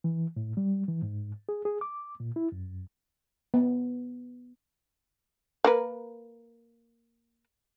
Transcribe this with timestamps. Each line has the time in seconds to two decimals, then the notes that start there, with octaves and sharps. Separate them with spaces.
0.04 E3
0.37 A2
0.57 G3
0.88 E3
1.02 G#2
1.49 G#4
1.65 G#4
1.81 D6
2.20 A#2
2.36 E4
2.52 F#2
3.54 B3
5.64 A#3 A#4 B4